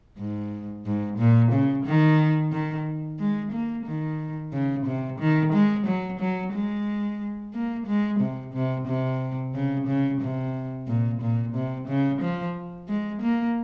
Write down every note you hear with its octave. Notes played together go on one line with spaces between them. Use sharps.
G#2
G#2
A#2
C#3
D#3
D#3
G#3
A#3
D#3
C#3
C3
D#3
G#3
F#3
F#3
G#3
A#3
G#3
C3
C3
C3
C#3
C#3
C3
A#2
A#2
C3
C#3
F3
G#3
A#3